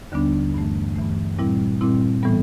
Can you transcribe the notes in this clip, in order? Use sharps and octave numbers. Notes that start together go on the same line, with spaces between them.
D#2 D3 G3 B3 D4
G2 E3 A3
G2 E3 A3
A#2 G3 C4 E4
A#2 G3 C4 E4
A2 E3 G3 B3